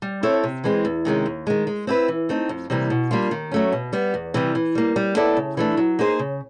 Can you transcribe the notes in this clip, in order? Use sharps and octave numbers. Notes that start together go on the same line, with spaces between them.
G3
C4 E4 A4 C#5
C3
E3 G#3 C4
E2
C3 D#3 G#3 C#4
D#2
D#3 G#3
G#3
C4 E4 G4 B4
E3
A3 C4 D#4
F2
C3 E3 G3 A#3
B2
G3 A#3 D4 F4
D#3
F#3 A3 C#4
B2
G3 B3
E2
C3 E3 G3
E3
G3 A#3
G3
B3 E4 A4 D5
C#3
E3 A3 D4
F#3
A#3 D#4 G#4 C5
C#3